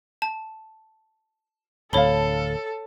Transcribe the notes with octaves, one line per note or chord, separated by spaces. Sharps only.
A5
D1 D2 A4 C#5 F5 A5 B5 G7